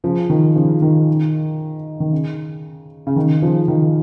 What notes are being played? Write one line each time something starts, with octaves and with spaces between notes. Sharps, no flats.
C#3 F3
D#3
C#3 F3
D#3
D#3
C#3
C#3
D#3
C#3 F3
D#3